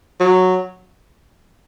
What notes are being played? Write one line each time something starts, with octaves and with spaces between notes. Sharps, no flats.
F#3